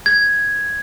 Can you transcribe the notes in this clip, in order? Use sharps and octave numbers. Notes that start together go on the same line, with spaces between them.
G#6